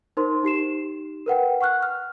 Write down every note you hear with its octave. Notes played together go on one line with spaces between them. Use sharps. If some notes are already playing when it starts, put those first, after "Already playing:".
D#4 A#4 C5 C6
D#4 G4 C7 E7
A#4 B4 F#5 G5
F#5 C#6 F6 F#6
F6